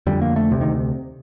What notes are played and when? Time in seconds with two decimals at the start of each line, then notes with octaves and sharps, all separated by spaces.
0.07 F2 D3 G3
0.22 A#3
0.36 A3
0.51 D2 C3
0.61 D#3